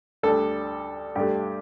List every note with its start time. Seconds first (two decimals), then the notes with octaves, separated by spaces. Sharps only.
0.23 D2 D3 G3 A4
1.15 G2 D3 A3 G4